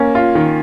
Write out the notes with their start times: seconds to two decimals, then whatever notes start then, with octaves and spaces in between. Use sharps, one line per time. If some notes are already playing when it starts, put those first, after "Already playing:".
Already playing: A#3 C#4
0.15 F4
0.35 D#3